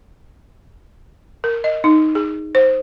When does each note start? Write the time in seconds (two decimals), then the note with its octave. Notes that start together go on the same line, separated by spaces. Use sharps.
1.44 A#4
1.64 D#5
1.84 D#4
2.15 G#4
2.55 C5